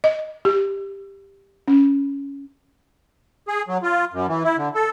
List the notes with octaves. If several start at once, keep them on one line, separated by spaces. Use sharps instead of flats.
D#5
G4
C#4
G#4
F#3
F4
F#2
E3
E4
D3
A4